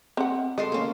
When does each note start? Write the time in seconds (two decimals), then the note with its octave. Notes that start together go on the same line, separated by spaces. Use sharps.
0.17 C4 F#5
0.58 G#3 A4 D#5 C6
0.72 A#3 C#4